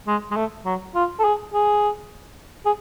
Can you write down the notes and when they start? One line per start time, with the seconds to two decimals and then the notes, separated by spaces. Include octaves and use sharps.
0.07 G#3
0.31 G#3
0.36 A3
0.65 F#3
0.95 F4
1.20 A4
1.24 G#4
1.54 G#4
2.66 G#4